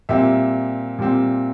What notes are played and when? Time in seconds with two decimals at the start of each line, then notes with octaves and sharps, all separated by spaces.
0.09 A#2 G3 C4 E5
0.99 A#2 G3 C4